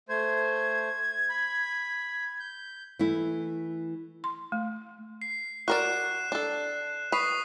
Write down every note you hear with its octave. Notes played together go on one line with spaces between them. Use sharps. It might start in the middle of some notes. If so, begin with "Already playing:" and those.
A3 C5 G#6
B5
G6
E3 A3 E4
C6
A3
C7
F#4 A#4 D5 F#6 E7
D4 A4
B4 C#6 D#6 C7